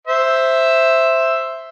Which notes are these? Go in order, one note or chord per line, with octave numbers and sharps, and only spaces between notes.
C5 E5